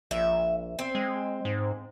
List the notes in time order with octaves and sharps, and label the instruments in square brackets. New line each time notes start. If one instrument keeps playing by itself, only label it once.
[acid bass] A#1 [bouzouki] E5
[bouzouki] C4
[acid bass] G#3
G#2